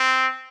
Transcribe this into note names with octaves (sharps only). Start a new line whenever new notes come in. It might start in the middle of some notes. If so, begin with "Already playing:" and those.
Already playing: C4